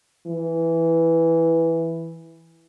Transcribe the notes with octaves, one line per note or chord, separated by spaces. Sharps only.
E3